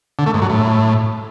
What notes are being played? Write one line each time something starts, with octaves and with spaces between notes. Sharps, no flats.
D3
A3
G#2
F#3
A2